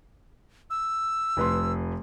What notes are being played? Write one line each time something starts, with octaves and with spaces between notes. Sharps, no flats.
E6
F1 B4 C6